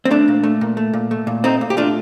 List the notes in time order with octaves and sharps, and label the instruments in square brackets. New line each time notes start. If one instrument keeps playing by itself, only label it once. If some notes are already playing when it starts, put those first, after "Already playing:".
[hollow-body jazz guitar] C4
A3 D4
A#2
A3
A#2
A3
A#2
A3
A#2
A3 C4 D#4
A#2
G4
A3 D4 F4